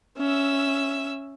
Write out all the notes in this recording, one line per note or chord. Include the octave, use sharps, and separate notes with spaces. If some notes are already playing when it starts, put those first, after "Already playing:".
C#4 E5 E6